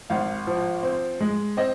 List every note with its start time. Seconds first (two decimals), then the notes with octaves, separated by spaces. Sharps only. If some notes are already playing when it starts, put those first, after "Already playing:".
0.10 G#1 F5
0.47 F3
0.83 C4
1.21 G#3
1.57 C4 D#5